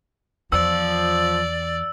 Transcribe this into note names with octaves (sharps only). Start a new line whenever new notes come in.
E2 F3 D5 E6